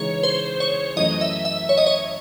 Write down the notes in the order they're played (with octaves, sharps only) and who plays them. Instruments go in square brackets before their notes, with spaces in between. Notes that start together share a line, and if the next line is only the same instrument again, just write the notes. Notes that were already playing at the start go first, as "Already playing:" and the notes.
Already playing: [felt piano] C#3 E3 G#3 D#4 G#4 [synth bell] C#5
[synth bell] C5
C#5
[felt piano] F#2 E3 A3 [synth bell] D#5
[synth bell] E5
E5
C#5
D#5
C#5